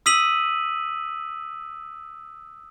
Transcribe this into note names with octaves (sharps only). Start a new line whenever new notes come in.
D#6 E6 B6 D#7 F#7